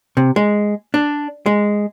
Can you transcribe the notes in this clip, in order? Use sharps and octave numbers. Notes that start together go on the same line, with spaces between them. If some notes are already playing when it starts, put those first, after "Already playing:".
C3
G#3
D4
G#3